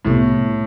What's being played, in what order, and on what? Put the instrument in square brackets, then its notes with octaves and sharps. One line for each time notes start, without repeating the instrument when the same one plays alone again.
[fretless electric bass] C2 C3 G3 B3 [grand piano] A2